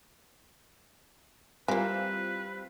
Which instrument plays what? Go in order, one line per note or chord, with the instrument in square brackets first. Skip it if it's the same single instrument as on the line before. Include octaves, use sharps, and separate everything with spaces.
[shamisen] E3 A#3 [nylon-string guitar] G3 [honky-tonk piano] C4 F4 [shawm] B4